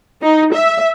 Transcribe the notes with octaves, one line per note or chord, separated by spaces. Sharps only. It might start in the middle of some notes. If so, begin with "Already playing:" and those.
D#4
E5